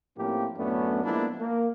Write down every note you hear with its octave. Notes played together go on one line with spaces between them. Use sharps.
A2 F3 A#3 C4 C#4 G4
F#2 A2 A3 B3 C#4 D4
F3 G#3 A#3 B3 D4 E4
A#3